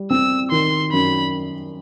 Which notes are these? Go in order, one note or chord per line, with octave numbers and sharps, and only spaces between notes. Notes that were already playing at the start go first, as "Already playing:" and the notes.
Already playing: G3
C4 E6
D#3 C6
F#2 B5